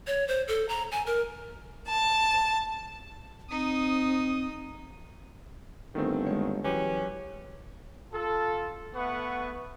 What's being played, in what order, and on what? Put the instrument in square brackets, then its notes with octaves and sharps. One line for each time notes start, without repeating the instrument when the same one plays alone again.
[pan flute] C#5
C5
A4
A#5
G#5
A#4
[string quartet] A5
[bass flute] C4 [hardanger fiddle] D#4 D#6
[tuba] G1 [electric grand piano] D#3 A3 C4
[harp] G#3 C#5
[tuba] E3 [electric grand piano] F#3 G4 B4 [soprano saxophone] C#4
[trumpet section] F4 A4
A3 B3 B4 F#5 C#6